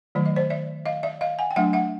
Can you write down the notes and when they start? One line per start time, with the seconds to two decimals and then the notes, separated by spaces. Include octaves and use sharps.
0.15 D#3 F#3 A3 D5
0.26 D#5
0.36 C5 D5
0.50 D5 E5
0.86 D#5 F5
1.03 D5 E5
1.21 D#5 F5
1.38 F#5 G#5
1.51 G5
1.56 F#3 A3 D4 E5 F#5
1.73 E5 F#5